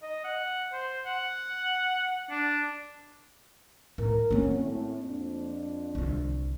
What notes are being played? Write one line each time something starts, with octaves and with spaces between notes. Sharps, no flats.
D#5
F#5
C5
F#5
D4
A2 A#4
D3 F#3 A#3 C4 C#4
A2
F2 D4
C2 D3